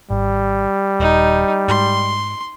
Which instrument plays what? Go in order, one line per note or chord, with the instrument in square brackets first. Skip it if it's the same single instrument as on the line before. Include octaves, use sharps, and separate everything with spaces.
[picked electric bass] G#1 [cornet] G3
[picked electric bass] D#1 [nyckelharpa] D#4
[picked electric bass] G#2 [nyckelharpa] C6